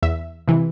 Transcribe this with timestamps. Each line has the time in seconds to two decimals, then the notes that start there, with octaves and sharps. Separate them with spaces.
0.03 E2 E5
0.48 C3 E3